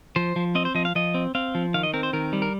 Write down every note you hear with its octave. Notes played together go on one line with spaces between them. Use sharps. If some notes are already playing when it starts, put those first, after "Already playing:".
F3 C5
F3
C4 D#5
C5
F3 D#5
F5
F3 D#5
C4
C4 F5
F3
D#3 F5
D#5
C4 A#4
C5
D#3 A#4
G3
A#4